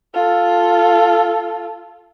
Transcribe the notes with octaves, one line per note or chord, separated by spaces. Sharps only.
F4 A4